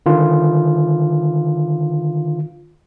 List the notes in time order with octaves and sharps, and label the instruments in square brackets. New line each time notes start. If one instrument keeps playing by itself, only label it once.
[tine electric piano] D3 D#3 F4